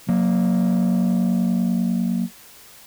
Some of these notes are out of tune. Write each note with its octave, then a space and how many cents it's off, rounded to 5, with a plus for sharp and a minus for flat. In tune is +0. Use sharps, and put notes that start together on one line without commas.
F#3 -20 A#3 +0